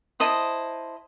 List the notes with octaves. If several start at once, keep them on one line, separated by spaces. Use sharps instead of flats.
E4 C5 D#5 A5